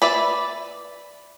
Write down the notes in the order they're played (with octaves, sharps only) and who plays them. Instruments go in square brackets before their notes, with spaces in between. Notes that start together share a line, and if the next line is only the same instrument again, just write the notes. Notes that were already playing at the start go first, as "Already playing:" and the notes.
[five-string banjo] B4 D5 E5